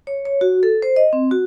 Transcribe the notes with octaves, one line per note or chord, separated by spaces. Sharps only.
C#5
C#5
F#4
A4
C5
D#5
C4
F#4